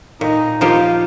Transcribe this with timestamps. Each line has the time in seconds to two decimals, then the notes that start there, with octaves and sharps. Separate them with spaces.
0.21 A#2 D#4
0.60 F3 A#3 D#4 F4 G4